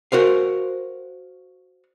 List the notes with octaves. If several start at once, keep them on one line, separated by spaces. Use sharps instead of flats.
F#4 A#4 C5 F5